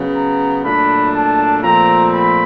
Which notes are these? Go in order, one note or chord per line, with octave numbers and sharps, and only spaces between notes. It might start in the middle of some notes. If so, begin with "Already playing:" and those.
Already playing: C#3 F#3 B3
A#5
A#2 F#3 A3 D4 B5
A5
A#2 F3 A3 C4 A#5
B5